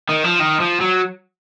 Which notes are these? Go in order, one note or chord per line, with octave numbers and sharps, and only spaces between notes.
D#3
F3
D#3
F3
F#3